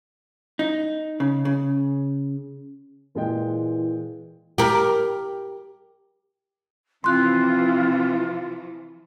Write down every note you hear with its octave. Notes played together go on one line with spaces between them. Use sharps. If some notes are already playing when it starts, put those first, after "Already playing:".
D#4
C#3
C#3
A#2 E3 G#3 G5
G4 A#4
C3 E3 F3 C4 F4 C6 F#6